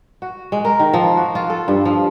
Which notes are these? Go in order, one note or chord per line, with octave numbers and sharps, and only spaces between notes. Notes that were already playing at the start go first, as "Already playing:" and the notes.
F#4
G#3
A#4
D#3
F3
F#4
F4
A4
G2
F3